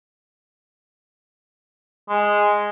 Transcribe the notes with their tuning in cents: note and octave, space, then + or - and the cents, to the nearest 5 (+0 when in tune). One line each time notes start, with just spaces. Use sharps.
G#3 -5